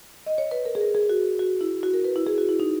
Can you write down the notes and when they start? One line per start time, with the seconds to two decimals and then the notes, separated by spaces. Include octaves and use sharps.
0.26 D#5
0.38 C#5
0.51 B4
0.65 A#4
0.75 G#4
0.81 A#4
0.95 G#4
1.10 F#4
1.39 F#4
1.61 E4
1.83 F#4
1.94 A#4
2.04 B4
2.16 E4
2.27 G#4
2.38 F#4
2.49 E4
2.60 D#4